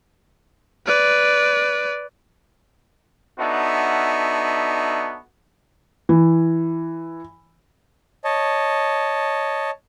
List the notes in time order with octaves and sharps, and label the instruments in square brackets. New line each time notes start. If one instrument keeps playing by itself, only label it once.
[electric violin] B4 D5
[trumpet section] B3 D4 D#4 F#4 A4 E5
[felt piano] E3
[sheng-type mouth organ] C#5 D#5 A5